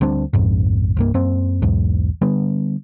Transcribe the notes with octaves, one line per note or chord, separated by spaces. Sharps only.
D2 G3 C4 D4
A#1 F2 G#2
C2 G2 A#3
F#2 A#3 C4
B1 E2 G#2
D3 G3 B3